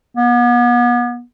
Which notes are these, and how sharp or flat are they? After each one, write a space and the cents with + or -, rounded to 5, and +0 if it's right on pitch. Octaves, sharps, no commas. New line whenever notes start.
B3 -35